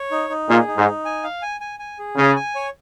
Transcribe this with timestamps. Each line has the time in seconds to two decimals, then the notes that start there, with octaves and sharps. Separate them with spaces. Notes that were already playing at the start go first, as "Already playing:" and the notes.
Already playing: C#5
0.11 D#4
0.30 D#4
0.49 A#2 G#4
0.67 D#4
0.77 G#2
0.86 D#4
1.05 G#5
1.24 F5
1.42 G#5
1.61 G#5
1.79 G#5
1.99 G#4
2.17 C#3 G#5
2.36 G#5
2.55 C#5